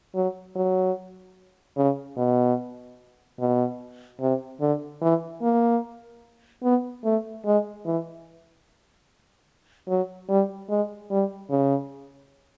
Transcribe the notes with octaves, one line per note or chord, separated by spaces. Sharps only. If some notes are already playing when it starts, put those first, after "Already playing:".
F#3
F#3
C#3
B2
B2
C3
D3
E3
A#3
B3
A3
G#3
E3
F#3
G3
G#3
G3
C#3